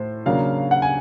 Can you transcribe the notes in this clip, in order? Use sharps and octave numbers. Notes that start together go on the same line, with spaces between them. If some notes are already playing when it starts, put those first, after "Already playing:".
Already playing: A2 C5
C#3 F#3 A#3 D4 F5
F#5
G#5